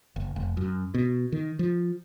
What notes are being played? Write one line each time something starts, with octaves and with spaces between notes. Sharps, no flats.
F#1
F1
F#2
B2
D#3
F3